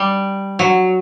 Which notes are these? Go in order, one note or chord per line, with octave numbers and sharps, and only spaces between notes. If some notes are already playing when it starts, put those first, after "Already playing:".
Already playing: G3
F#3